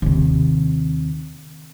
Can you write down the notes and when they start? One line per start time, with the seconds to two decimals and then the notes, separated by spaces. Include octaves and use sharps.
0.02 D#2 C3